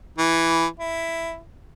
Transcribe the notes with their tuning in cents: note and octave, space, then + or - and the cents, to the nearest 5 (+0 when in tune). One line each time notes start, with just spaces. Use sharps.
E3 +5
E4 +5